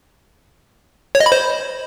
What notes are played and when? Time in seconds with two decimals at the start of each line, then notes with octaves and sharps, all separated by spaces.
1.15 C#5
1.20 D#5
1.26 B5
1.32 C5